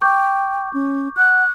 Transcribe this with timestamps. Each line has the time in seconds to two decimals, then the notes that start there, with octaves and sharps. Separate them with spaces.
0.01 G5 C#6 D6 G6
0.74 C#4
1.17 F#5 F#6